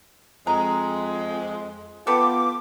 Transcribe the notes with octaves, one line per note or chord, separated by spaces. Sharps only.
F2 G#3 A#5
B3 F4 A4 B4 G5 D6